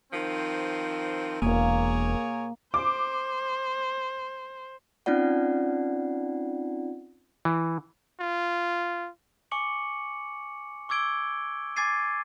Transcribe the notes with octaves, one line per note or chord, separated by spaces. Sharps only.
D#3 F3 C4
E1 A#3 G#4 A#4 C#5
C5 D6
C4 C#4 D#4 F4 D5 F#5
E3
F4
G#5 C#6 D6 C#7 F#7
C#6 D6 E6 G#6 D7 G7
G#5 D6 G#6 A6 C7 D#7